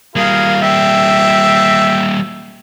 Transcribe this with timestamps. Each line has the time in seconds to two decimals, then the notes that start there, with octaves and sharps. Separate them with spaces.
0.16 G3 A#3 F4 G#4 A#4
0.62 C4 E5 E6